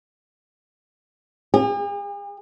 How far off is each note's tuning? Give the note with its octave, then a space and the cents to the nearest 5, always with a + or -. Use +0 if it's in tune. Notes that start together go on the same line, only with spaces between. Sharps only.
G#4 -45